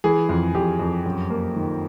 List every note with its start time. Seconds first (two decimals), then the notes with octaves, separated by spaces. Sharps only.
0.04 E3 G#4
0.29 F2
0.55 F2 G4
0.79 F2
1.06 F#2
1.30 A#3
1.56 D#3